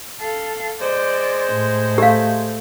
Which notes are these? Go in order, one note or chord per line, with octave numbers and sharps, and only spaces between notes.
A4 F5
G#3 C5 D5
A2
A3 G4 F5